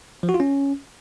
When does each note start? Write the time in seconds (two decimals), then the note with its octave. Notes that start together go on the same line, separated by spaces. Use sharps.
0.23 F3
0.29 F#4
0.34 F4
0.40 C#4